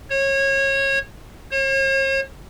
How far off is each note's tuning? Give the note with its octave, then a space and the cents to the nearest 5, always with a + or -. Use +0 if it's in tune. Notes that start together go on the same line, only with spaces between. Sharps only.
C#5 -25
C#5 -45